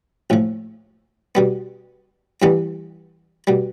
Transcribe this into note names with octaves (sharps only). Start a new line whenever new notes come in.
A#1 A2 F3
B2 G3 B3
G2 E3 G3 B3
B2 G3